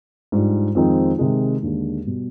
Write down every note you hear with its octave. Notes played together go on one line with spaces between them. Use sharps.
G#2 G3 D4 F4
F2 D#3 G#3 C4 D#4
C3 D#3 G#3
D#2 D3 G#3
B2 G3